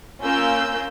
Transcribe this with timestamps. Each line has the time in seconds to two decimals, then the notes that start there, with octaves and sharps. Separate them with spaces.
0.22 A#3 C#4 F4 A#4 E6 G6